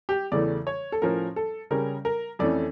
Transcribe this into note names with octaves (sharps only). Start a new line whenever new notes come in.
G4
E2 C#3 E3 A3 D5
C#5
A4
A2 F3 C#4 A#4
A4
C#3 G3 C#4 A#4
A#4
F2 E3 A3 C#4 D5